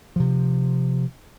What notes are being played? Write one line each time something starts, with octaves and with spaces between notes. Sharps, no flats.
C3 F3